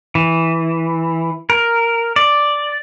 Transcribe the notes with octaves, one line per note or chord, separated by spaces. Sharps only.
E3
A#4
D5